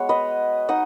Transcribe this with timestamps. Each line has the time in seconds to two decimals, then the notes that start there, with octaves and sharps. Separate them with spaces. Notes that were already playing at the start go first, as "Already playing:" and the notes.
Already playing: G#3 B3 F#4 C#5
0.09 B4 D#5
0.69 D#4 D#5 F#5